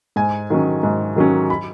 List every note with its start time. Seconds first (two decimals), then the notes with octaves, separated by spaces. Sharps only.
0.16 G#2 G#5
0.50 D#3 F#3 C#4
0.83 G#2
1.16 D#3 F#3 C#4
1.50 B5